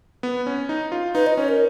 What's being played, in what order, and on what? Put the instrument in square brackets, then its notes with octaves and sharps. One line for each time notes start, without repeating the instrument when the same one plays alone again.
[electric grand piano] B3
C#4
D#4
F4
[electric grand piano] D#4 [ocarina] B4
[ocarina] D#5
[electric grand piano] C#4 [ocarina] C#5
[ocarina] A#4